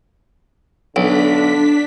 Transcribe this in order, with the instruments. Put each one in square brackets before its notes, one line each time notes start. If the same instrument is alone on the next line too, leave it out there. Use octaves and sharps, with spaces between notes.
[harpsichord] B1 [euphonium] D3 [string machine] D4 B6